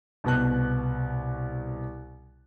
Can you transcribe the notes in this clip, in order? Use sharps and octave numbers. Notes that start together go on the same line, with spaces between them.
C2 B2 B3 A5 F#6